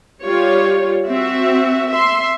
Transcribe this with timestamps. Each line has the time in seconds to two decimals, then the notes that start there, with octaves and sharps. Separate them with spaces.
0.23 G3 F4 G4 C#5
1.07 C4 F#4 E5
1.91 E5 C6